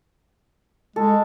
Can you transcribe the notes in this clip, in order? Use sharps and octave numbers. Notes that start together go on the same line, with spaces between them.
G#3 A4